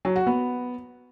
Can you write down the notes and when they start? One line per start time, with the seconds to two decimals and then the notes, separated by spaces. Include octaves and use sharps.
0.05 F#3
0.16 F#4
0.27 B3